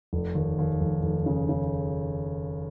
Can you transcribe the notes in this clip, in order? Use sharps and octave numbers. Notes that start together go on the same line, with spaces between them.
F1
D#2
D#2
F1
F1
C#3
C#3